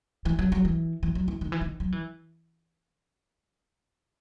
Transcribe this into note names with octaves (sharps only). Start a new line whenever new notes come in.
E3
F#3
F#3
E3
E3
F#3
E3
D#3
E3
D#3
F#3
E3